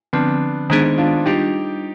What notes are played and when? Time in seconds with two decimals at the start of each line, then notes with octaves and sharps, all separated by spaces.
0.13 D3 F3 B3 C4 D4
0.70 D#3 G#3 B3 C4 D4 D#4 G#4
0.98 D4 F4
1.26 G3 D4 D#4 F4 G4